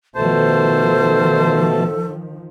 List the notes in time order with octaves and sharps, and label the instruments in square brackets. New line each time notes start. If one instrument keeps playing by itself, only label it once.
[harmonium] B2 A3 A5 [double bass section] D#3 F3 [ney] A4 [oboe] C5